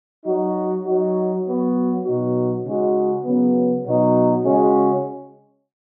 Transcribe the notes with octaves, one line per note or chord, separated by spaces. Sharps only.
F#3 D#4 F#4
F#3 D#4 F#4
F#3 B3 F#4
B2 F#3 D#4 F#4
C#3 G#3 D#4 F#4
C#3 F#3 B3
B2 F#3 D#4 F#4
C#3 G#3 C#4 F#4